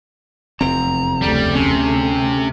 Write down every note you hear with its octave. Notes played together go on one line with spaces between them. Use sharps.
F1 E2 C4 A#5
D2 C#3 G3 A3
C3 C#4